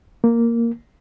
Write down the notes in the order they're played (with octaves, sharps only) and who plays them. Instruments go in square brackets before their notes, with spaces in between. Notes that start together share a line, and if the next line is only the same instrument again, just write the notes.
[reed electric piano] A#3